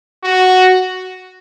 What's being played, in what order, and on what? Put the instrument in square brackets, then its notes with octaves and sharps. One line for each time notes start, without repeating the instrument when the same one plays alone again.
[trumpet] F#4